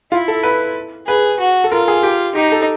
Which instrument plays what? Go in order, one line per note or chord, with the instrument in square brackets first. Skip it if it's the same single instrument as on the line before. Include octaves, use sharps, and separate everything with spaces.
[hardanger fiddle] E4 [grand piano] F4
[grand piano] A4
B4
[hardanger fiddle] G#4 [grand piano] B4
[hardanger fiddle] F#4
[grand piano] A4
[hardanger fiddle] F4 [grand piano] A#4
[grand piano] G#4
G4
[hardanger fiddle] D#4 [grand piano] G4
[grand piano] A4